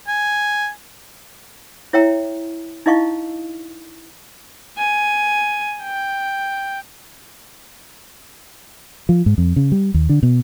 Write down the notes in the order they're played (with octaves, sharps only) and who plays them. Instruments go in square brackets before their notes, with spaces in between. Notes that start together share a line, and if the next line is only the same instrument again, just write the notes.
[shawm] G#5
[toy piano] E4 C#5 E5 G5 A#5
D#4 E4 D#5 F5 C#6
[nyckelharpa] G#5
G5
[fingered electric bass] F3
G#2
F2
C#3
G3
D#2
D3
B2